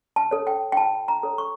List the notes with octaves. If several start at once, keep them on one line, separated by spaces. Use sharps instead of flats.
A5
A4 C#5
G5
G5
F4 A5
A#5
A4 C#5
C#6